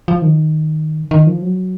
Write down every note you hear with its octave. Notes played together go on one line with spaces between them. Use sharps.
F3
D#3
D#3
F3
F#3